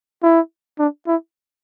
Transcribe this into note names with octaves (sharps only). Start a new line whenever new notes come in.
E4
D4
E4